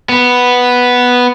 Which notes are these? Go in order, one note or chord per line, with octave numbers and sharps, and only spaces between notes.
B3